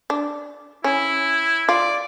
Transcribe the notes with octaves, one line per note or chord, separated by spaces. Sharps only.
D4
C#4 E4
F4 D5